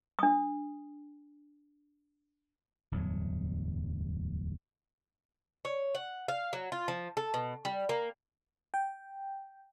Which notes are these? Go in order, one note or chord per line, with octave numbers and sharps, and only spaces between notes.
D4 D#6
D1 E2 G2 F#3
C#5
F#5
F5
F#3
F4
F3
A4
B2
G3
A#3
G5